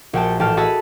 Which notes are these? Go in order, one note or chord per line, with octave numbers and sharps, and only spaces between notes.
A#1 F#4 G5 A5
A1 G5 A5 F6 E7
F#4 G#4 D#5 A5 B5 E6